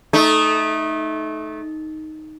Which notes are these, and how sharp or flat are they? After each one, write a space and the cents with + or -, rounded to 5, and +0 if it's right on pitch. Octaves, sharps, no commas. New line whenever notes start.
A3 -20 D#4 +0